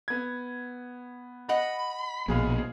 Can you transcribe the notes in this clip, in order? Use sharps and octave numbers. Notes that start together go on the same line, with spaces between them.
B3 G#6
D#5 F#5 B5
A#1 B2 G#3 G#4 F5